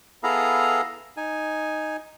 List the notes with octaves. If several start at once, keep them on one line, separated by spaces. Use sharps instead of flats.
B3 E4 G#4 A4 F5 A#5
D#4 G#5